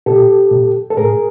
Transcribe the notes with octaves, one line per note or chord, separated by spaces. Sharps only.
A#2 G4 A4
A#2
A4
A2 G#4 A#4